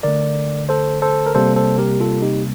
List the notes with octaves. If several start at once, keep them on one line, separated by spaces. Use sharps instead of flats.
D3 A3 A#4 D5
A4 C5
A4 C5
A#4
C3 G3 A#3 A4 C5
A4 C5
G4 A#4
F4 A4
D#4 G4